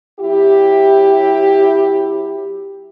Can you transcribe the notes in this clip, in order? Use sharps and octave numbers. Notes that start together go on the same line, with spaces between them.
F#3 E4 G4